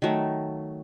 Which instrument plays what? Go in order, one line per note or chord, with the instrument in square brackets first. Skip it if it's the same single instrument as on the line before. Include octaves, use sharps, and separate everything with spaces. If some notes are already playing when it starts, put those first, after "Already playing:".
[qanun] D#3 F#3 A3